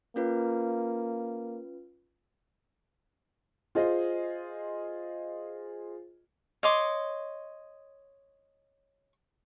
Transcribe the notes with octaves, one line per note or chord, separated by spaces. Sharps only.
A#3 C#4 F4 B4
F4 G#4 C5 D#5
C#5 D#5 C6 D6